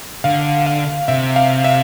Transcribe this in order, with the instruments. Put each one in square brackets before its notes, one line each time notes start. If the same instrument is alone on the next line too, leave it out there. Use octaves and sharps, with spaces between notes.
[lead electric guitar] D3 [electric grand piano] F5
[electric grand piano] F5
[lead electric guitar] C3 [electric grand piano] E5
[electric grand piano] F5
E5